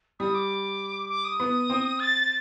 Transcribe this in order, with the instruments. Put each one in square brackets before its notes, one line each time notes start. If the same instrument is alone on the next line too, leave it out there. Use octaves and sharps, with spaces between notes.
[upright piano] G3 [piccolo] D#6
[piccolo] D6
D6
D#6
[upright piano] B3
C4
[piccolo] A6